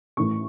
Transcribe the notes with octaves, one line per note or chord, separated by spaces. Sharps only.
A1 A2 E3 A3 C#6